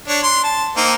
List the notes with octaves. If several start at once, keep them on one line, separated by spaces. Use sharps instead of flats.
D4 C#5
C6
A5
A#3 C4 D#4